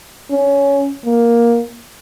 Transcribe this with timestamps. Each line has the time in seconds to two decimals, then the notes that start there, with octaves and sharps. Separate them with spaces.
0.30 C#4
1.06 A#3